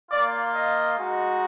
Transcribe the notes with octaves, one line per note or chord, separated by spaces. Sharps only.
A#3 F4 D5
D#5
G#3 D#4 F#4